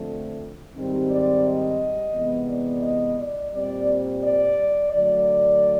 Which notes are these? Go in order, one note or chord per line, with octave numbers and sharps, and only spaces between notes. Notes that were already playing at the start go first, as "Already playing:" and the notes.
Already playing: F2 D3 F3 A3 C4
G#2 D#3 G3 C4
D5
D#5
C3 E3 G#3 B3
D5
D#5
D5
A#2 G3 C4 D5
D5
D3 F#3 A3 D5